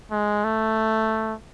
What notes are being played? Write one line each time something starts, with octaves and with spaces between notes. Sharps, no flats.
G#3
A3